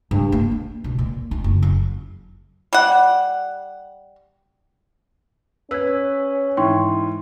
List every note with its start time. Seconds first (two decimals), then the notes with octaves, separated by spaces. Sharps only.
0.11 G2
0.32 A#3
0.51 D4
0.84 B1
0.99 A#2
1.31 D#4
1.44 F#1
1.63 F#2
2.73 G3 F#5
5.71 C#4 B4 E6 G#6
6.57 G#2 E3 G5 C6 C#6